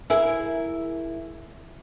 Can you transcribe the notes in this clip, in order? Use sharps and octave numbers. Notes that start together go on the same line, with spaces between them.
E4 G#4 A#4